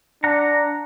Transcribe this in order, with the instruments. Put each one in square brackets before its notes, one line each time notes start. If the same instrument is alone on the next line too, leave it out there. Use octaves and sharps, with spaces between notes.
[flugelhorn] D4 [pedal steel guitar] F#5 A#5